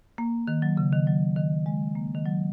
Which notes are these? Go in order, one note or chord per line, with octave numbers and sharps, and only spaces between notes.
A#3
D#3
F#3
C#3
D#3
F#3
D#3
G#3
A#3
D#3
F#3